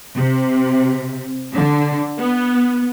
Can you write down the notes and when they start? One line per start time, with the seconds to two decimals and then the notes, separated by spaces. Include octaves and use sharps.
0.16 C3
1.53 D3
2.19 B3